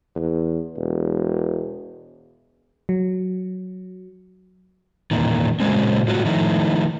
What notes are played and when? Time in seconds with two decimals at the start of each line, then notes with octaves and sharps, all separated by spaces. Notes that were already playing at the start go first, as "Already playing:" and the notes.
0.16 E2
0.77 E1
2.89 F#3
5.11 E2 A#2 D#3
5.60 A#2 C#3 F#3 G#3 C4 C#4
6.08 A2 F#3 F4 F#4
6.25 D#3 F3 A3 D#4 E4